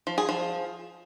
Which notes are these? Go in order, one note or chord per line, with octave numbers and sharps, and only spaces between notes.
F3
G#4
F3